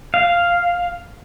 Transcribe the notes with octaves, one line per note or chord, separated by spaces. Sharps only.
F5